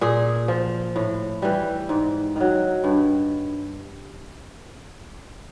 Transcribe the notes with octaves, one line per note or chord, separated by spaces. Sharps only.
A#2 G#4
F3
A2
E3 G3
G#2
D#3 F#3
G2